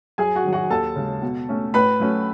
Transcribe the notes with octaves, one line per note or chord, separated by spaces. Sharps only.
F#2 G#4 G#5
F#4 F#5
D#3 F#3
F#4 F#5
D#2 A4 A5
C#3 G#3
B2
A3 C#4
A2 B4 B5
F#3 A3 C#4